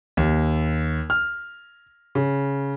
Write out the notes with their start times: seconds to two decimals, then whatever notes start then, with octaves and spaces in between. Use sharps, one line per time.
0.17 D#2
1.10 F6
2.15 C#3